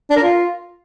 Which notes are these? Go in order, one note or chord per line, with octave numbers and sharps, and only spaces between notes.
D4
A#4
F4